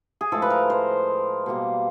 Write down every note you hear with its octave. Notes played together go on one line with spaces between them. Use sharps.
G#4
A2 F3 G#3 A4
B4
A#4
C5
B2 G3 A#3